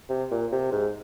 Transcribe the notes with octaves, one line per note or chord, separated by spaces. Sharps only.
C3
A#2
C3
G#2